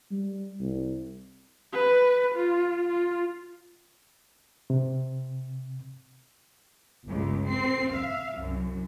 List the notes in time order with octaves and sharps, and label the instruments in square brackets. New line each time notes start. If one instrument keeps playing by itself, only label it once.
[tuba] G3
C2
[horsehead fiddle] B4
F4
F4
[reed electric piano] C3
[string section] G1 C#2
C4 C7
E5 F5
C2 F#2